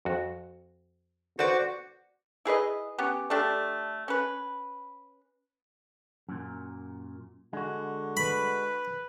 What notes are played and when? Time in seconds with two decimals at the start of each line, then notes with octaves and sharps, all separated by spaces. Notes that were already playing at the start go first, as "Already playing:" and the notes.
0.05 F2 F#4
1.39 F#4 A4 B4 C5 D5
2.45 E4 G#4 B4 D#5
2.98 B3 C#4 G4
3.30 A3 D4 G4
4.08 C#4 B4
6.29 F#2 A#2
7.53 D3 G#3 F#4
8.17 B4 B5